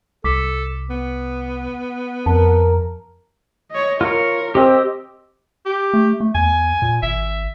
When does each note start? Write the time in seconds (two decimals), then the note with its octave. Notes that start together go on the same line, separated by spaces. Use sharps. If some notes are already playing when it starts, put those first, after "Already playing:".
0.24 C2 A4 D6 B6
0.90 B3
2.26 F2 A#4 A5 A#5
3.71 C#5 D#5
4.01 F4 A#4 C#5
4.55 C4 G4 D#5 E6
5.66 G4
5.94 A3
6.20 A3
6.35 E2 G#5
6.82 A#2
7.03 G#1 E5